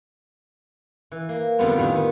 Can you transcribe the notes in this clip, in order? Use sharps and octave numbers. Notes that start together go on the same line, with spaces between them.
E3
A#3
F2 D3 G3 B3 F4 A5
A2 D#3 G4 G#5
B3